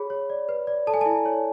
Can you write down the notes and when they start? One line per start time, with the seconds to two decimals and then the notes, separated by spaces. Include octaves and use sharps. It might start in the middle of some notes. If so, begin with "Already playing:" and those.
Already playing: G#4 C#5 B5
0.10 C#5
0.30 D5
0.49 B4
0.67 D5
0.87 A4 A5
0.94 G#5
1.01 E4 A5
1.26 C#5